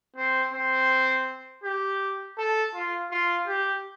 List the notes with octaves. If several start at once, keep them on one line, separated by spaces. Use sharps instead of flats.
C4
C4
G4
A4
F4
F4
G4